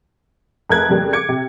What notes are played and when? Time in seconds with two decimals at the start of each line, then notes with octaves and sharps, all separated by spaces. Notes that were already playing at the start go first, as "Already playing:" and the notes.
0.69 F1 A#4 F#6 G#6
0.89 F2 C#3 G3 A#3
1.13 D6 G#6 C#7
1.29 C3